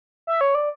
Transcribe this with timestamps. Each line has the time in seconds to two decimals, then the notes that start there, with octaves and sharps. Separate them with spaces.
0.27 E5
0.41 C#5
0.55 D5